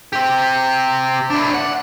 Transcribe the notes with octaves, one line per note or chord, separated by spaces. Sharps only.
C4 G4
D4 E4
F#5